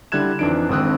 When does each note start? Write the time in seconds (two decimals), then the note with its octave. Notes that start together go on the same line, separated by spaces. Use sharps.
0.12 D3 G3 E4 F#6 G#6 E7
0.39 F2 E3 D4 D#4 D7
0.69 G#1 D3 C4 D#6 E6 F#6